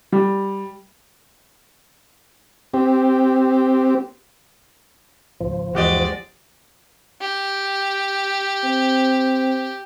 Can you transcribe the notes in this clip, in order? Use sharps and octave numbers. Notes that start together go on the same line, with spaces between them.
G3
C4 G4
G#1 C#2 F3
G1 D#2 E3 G#3 F#4 G4 D5 D#5
G4
C4